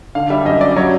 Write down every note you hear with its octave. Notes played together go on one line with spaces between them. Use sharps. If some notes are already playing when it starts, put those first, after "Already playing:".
D3 F5
G3 E5
F#2 D#5
F#2 D5
F#3 C#5